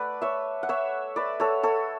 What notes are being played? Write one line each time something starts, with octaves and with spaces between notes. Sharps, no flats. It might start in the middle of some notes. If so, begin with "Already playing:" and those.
Already playing: A3 B4 D5 F#5
C#5 E5
F#5
C#5 E5
B4 D5
A4 C#5
A4 C#5